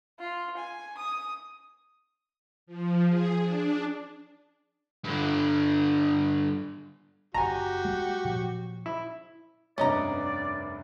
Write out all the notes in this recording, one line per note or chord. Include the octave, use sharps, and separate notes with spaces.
F4
G#5
D#6
F3
G#4
D4
G2 D3
F#1 F#4 G4 G#5 A#5
G3 G#3 A#3
A#2 F3 F#3
E4
F1 C2 G2 C#4 D5 D#5 A#5